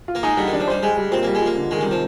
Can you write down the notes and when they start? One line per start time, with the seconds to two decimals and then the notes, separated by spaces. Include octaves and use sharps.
0.08 F4
0.15 A#3
0.23 G#3 D#4
0.37 D3 G3
0.48 D#3
0.53 D4
0.60 F3
0.68 G3 C5
0.83 G3 G#3
0.97 G3
1.11 A#2 C4
1.23 G3 A#3
1.35 G#3
1.41 F3 A#3
1.56 D3
1.71 D#3 G#3
1.81 C3 G3
1.91 F3